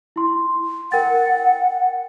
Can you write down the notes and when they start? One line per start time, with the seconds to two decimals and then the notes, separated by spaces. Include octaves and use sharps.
0.16 E4 C6
0.92 A#4 F#5 G5 A6